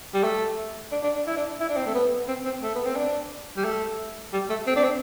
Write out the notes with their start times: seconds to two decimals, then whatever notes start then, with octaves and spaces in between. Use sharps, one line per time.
0.14 G3
0.24 A3
0.92 D4
1.03 D4
1.15 D4
1.27 E4
1.37 D4
1.60 E4
1.69 D4
1.77 C4
1.86 A3
1.95 B3
2.28 C4
2.45 C4
2.62 A3
2.75 B3
2.85 C4
2.97 D4
3.57 G3
3.65 A3
4.33 G3
4.50 A3
4.67 C4
4.76 D4
4.84 C4